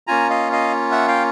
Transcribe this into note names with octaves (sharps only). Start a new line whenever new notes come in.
A#3 C#4 F4 G#5 A#5
D#5 F5
D#5 F5
E5 F#5
F5 G5